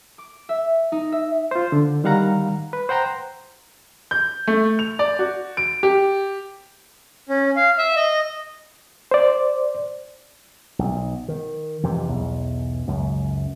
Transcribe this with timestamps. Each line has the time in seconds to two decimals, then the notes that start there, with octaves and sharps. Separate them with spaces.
0.18 D6
0.49 E5
0.92 D#4
1.12 E5
1.51 F4 C5
1.72 D3
2.04 D#3 G3 F5 F#5 A#5
2.73 B4
2.89 C5 F#5 G5 A#5 C6
4.11 G6
4.47 A3
4.79 F7
4.99 D5
5.19 F#4
5.57 D7
5.83 G4
7.29 C#4
7.56 F5
7.78 E5
7.97 D#5
9.11 C5 D5
10.79 B1
11.28 D#3
11.83 F2 C3 E3
12.08 B1 E2
12.88 C#2 F#2